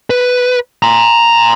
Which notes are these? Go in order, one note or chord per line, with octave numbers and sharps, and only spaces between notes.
B4
A#5 C6